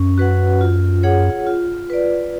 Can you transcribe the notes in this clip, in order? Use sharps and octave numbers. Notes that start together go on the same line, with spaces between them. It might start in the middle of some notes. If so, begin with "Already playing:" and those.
Already playing: F#2 C#4
F#4 B4 F#5
F4
G#4 C#5 F#5
F4
B4 D5